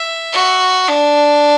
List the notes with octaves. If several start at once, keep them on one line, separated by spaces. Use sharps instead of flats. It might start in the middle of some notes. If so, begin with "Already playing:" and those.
Already playing: E5
F#4
D4